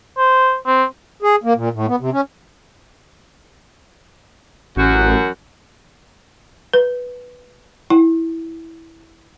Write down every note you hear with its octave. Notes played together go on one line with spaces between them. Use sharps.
C5
C4
G#4
A#3
A#2
A2
B3
C3
C#4
A1 F#2 F#4
B4
E4